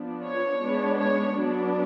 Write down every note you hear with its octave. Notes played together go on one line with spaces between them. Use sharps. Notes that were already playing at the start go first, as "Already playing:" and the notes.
Already playing: F3 B3 D4
C#5
G#3 B3 D4
C#5
F#3 B3 D4